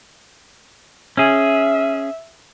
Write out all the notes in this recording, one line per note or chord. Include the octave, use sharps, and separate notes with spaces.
C#4 G#4 E5